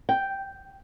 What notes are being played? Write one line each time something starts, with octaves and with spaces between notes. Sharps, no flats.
G5